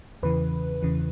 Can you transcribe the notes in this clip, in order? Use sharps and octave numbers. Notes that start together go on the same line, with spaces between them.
E2 C#3 E3 B4
E2 C#3 E3